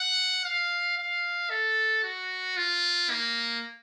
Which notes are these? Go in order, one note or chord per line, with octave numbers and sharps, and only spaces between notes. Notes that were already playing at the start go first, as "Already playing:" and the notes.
Already playing: F#5
F5
F5
A4
F#4
F4
A#3